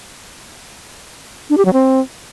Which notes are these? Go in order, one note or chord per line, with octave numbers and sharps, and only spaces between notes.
D4
G4
F#3
C4